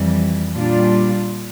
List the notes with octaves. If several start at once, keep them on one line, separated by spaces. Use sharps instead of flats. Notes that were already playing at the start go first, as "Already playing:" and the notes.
Already playing: F2 E3 G3
A#2 G3 D4 F4